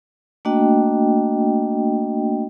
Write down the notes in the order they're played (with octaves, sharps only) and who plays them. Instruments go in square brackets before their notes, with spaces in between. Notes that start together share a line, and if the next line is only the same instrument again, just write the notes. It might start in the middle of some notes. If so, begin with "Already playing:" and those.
[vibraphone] A3 A#3 D4 F#4 D#5 G5